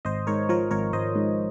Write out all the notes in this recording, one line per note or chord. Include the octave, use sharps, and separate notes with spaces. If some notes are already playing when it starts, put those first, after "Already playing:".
G#1 C5 D#5
G#2 A#4 C#5
F3 A#4 C#5
G#1 A#4 C#5
G#1 C5 D#5
G#2